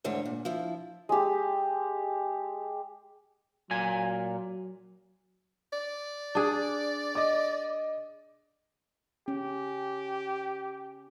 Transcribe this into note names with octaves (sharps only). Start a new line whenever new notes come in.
D2 G#2 E3 D4 C#5
A#2
F3 E4
G#3 G4
A#2 F#3 G#5
D5
D4 G#4
D#5 D6
C#4 G4